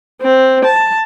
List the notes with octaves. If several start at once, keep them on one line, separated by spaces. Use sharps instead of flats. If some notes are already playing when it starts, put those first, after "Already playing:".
C4
A5